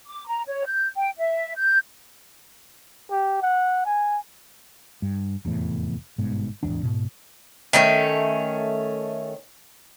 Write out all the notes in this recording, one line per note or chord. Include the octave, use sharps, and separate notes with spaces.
D6
A#5
C#5
G6
G5
E5
G6
G4
F#5
G#5
G2
F1 E2 A2
G1 G#2 B2
D1 G#1 E2 D4
G#2 B2
D#3 A3 C#4